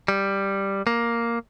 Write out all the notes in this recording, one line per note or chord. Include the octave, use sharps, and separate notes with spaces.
G3
A#3